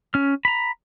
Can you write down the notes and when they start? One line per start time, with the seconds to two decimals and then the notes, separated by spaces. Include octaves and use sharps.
0.14 C#4 F6
0.45 A#5 B5